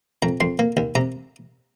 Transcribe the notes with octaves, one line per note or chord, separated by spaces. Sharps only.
F2 A#5
F2 C6
A#3
D#2
C3 A#5